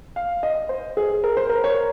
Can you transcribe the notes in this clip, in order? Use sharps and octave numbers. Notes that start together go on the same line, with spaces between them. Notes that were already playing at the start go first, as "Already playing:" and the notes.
F5
D#5
C5
G#4
A#4
C5
A#4
C#5